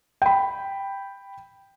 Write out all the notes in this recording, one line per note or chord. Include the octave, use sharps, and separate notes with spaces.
G5 B5